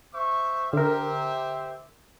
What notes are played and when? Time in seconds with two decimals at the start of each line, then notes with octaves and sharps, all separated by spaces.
0.14 C5 E5 C#6
0.73 D3 G4 A#4 C5 E5